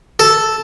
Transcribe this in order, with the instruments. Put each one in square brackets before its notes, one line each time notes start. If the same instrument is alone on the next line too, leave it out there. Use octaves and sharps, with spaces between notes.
[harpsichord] A4